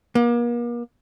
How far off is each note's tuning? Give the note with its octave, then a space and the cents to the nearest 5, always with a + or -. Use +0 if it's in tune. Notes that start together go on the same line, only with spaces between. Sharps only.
A#3 +40